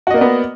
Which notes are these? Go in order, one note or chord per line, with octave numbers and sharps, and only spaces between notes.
A#3 B3 F#4 D5 D#5